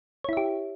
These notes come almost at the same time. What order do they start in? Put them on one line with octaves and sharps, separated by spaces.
C#5 E4 E5 G4